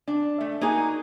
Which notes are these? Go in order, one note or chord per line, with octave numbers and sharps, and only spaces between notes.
D4
A3
A#3 D#4 F#4 G#4